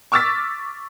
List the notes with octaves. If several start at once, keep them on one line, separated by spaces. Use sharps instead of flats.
C#6 D6 E6 F6 A6 B6